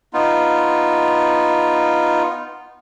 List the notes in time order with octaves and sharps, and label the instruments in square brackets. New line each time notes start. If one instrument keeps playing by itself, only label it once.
[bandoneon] B3 D#4 F4